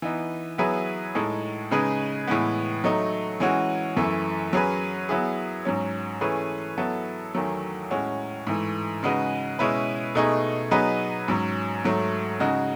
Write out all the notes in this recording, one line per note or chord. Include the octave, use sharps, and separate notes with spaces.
E3 B3 D#4
F#3 B3 E4 G#4 B4
A2 G#3 D#4 A4
C#3 G#3 D#4 G#4 B4
A2 E3 G#3 B3
F#3 A3 D#4
E3 G#3 C#4 F#4
F#2 E3 A3
F#3 C#4 G#4 B4
F#3 B3 E4 G#4
G#2 F#3 C#4
E3 A3 C#4 G#4 B4
F#3 B3 E4 A4
E2 D#3 F#3 A3
A2 G#3 C#4 F#4
G#2 E3 A3
C#3 G#3 D#4 F#4 B4
B2 G#3 C#4 E4 B4
B2 A3 D#4 G#4
F#3 B3 D#4 G#4 B4
G#2 F#3 C#4
G#2 F#3 A3
C#3 G#3 D#4 F#4